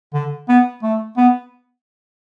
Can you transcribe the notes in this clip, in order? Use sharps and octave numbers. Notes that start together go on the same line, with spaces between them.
D3
B3
A3
B3